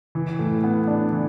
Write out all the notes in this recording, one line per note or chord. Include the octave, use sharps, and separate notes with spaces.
E3
A2
B3
D4
E3